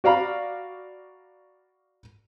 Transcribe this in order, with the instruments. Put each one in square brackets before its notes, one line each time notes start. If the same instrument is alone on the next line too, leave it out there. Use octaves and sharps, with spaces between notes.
[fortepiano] F#4 D5 F5 A#5 B5